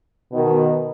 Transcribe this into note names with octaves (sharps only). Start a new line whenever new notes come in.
B2 D#3